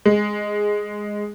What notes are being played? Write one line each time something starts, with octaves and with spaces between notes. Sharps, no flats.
G#3